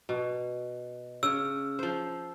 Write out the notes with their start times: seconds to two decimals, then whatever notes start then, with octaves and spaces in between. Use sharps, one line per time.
0.09 B2
1.23 C#3 E6
1.79 F3 C5